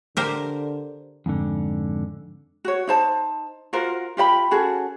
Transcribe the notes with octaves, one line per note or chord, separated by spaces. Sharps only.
D3 G4 A#4 C5
F2 G#2 D3
F#4 C#5
D#4 C5 A5
F4 F#4 A#4 C5
F4 G4 D#5 B5
C#4 F#4 G#4 A4